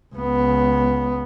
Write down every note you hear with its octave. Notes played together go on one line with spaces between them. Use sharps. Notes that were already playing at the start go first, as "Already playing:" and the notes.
C#2 B3